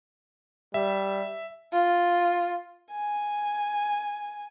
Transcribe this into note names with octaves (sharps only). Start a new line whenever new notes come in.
G3 E5
F4
G#5